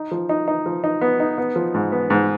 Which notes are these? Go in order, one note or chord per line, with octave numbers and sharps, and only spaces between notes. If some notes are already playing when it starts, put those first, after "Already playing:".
Already playing: D#4
F3
D#4
D#4
F3
D#4
B3
D#4
B3
F3
G#2
B3
G#2